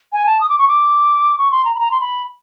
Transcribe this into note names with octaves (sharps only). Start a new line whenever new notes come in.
G#5
A5
D#6
D6
C#6
D6
C#6
C6
A#5
B5
A#5
C6
B5